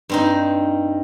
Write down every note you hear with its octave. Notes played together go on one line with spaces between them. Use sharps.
G2 C4 D#4